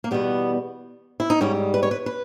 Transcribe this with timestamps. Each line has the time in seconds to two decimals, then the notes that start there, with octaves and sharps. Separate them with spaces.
0.04 A#3
0.11 E2 B2 G3 B3
1.20 E4
1.30 D#4
1.41 G#2 G3 C#4
1.74 B4
1.83 C#5
1.91 B4
2.06 B4